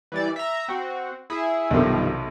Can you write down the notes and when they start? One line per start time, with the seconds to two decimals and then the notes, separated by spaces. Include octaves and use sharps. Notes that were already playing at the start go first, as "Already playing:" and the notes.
0.12 E3 G3 D5
0.36 E5 A#5
0.68 C4 F#4
1.30 E4 G#4
1.71 B1 G2 C3 D#3 F3 A4